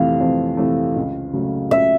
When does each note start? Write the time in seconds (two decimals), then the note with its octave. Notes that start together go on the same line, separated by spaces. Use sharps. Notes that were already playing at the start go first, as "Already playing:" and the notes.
Already playing: F2 C3 E3 A3 F5
0.20 F2
0.57 C3 E3 A3
0.96 C#2
1.33 C#3 F#3 A3
1.71 C#2 E5